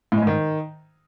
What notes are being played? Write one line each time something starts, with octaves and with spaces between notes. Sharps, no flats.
A2
G#3
G#2
D#3